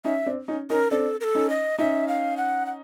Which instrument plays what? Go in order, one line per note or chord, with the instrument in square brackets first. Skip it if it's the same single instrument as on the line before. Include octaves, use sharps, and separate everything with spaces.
[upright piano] C#4 D#4 [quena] E5
[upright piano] C4 D4
C#4 D#4
[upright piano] C#4 D#4 [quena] A#4
[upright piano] C4 D4 [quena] A4
[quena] A#4
A4
[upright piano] C#4 D#4
[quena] D#5
[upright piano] C#4 D#4 [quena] E5
[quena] F5
F#5
F#5